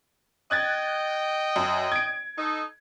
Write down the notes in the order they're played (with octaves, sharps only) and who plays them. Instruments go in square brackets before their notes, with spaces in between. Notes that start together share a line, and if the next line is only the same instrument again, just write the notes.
[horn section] D#5 G5 [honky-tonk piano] F#6 G#6 A6
[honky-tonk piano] F#2
G#6 D7
[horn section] D#4 A4